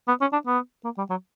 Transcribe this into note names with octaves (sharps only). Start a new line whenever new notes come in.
B3
C#4
D4
B3
A#3
G3
F#3